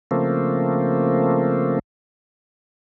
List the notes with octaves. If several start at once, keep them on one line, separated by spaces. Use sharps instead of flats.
C#3 F3 A3 A#3 C4